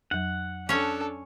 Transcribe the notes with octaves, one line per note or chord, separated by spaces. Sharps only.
F2 F#3 F#5
C#4 D4 A4 C#5